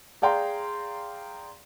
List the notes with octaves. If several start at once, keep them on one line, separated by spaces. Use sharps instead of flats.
G#4 D5 F5 G5 A#5 C6